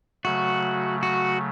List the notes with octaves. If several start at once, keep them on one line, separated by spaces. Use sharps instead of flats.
C#3 F#3 A3 F#4
F#4